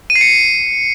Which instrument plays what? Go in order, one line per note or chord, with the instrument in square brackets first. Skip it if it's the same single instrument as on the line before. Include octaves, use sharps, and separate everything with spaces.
[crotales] D#7
C7
C#7